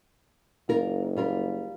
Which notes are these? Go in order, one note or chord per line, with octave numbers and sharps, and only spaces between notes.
F#1 F4 A#4
G3 F4 A#4